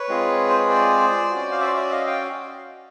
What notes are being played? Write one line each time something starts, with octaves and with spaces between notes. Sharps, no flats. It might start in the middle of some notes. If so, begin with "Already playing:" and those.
Already playing: B4 C#5
G#3 C4 F4 G#4
C5
C#5
C5 D5
C#4 F#4
F5
D5 E5
D5 E5
D#5 F5
F5 G5